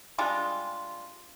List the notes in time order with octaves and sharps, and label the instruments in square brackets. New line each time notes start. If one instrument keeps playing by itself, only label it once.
[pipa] G3 G#3 D4 F4